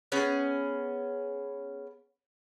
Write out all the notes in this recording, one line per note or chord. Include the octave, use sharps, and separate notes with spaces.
B3 C#4 G#4